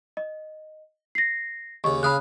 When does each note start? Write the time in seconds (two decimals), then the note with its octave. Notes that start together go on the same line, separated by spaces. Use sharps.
0.17 D#5
1.15 A#6 C7
1.84 D#2 C#3 D#5 C#6
2.03 C#3 F5 B5 D#6 F#6